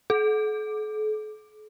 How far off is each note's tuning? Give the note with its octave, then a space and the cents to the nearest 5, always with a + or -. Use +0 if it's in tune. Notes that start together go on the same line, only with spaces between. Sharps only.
A4 -45